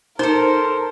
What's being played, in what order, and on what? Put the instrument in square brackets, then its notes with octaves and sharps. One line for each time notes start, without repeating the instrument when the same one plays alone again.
[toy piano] D#4 [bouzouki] A4 C5 [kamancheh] A#4